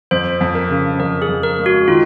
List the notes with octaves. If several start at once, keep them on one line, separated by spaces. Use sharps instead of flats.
F2 C5
F2
A#4
C#3
F2 A#4
G#4
F2
A#4
G#3
F#4
D#3 F4